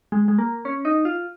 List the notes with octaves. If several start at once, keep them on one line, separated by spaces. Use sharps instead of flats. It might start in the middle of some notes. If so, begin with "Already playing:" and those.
G#3
G#3
A#3
C#4
D#4
F4